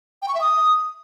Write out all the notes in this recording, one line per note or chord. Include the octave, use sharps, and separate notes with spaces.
G5
C#6
E5
D#6